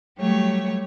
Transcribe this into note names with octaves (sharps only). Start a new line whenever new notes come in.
F#3 G3 A3 G4 C#5